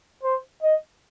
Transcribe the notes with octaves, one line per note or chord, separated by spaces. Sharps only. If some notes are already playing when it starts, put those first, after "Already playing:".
C5
D#5